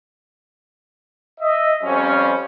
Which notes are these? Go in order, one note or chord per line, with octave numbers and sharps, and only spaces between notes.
D#5 E5
F2 F3 G3 C#4